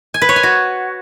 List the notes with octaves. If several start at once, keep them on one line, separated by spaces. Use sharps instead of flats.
G#5
B4
C#5
G#5
F#4